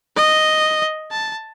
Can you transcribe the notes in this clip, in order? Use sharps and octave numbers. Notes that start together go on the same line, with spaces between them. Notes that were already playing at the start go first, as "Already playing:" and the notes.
D#5
A5